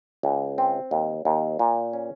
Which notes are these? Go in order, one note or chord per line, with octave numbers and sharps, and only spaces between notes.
C#2
C4
D#2
D#2
A#2
C#4